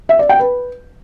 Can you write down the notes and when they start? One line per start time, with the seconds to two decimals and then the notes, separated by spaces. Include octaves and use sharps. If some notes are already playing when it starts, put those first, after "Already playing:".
0.09 E5
0.19 D5
0.29 G5
0.40 B4